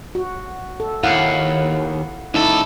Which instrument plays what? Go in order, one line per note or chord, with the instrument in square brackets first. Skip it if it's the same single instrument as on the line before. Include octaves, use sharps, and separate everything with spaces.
[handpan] F#4
A4
[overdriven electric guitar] D#2 [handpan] E4 F5 F#5
[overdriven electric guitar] C#2 A4 [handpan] D#4 E4